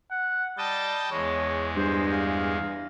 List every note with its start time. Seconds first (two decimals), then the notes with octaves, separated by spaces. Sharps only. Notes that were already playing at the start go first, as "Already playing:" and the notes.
0.11 F#5
0.58 G3 D#5 G5 A5
1.12 E2 G#3 C#5
1.76 G2 C5
2.13 F5